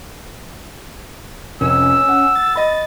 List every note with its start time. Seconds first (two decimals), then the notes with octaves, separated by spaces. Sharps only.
1.61 F1 C#4 E6
2.09 F#5
2.35 A6
2.56 D#5 B5